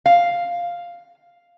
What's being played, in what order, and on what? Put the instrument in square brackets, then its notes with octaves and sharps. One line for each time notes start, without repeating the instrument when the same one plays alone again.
[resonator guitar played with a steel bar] F5